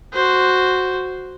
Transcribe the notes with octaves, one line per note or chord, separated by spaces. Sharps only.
F#4 C5